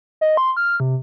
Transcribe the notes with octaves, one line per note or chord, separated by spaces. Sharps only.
D#5
C6
F6
C3